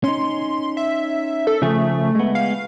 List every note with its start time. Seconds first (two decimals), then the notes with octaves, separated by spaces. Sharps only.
0.04 C#4 D#4 C6
0.77 E5
1.47 A4
1.62 C#3 F3 A3 G#4
2.15 G#3 B3
2.35 F5